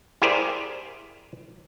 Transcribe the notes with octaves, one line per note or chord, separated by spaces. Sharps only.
E4 G4 G#4 A#4 C5 D5